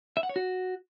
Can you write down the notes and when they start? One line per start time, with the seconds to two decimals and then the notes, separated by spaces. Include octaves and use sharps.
0.17 E5
0.23 F#5
0.29 C#5
0.36 F#4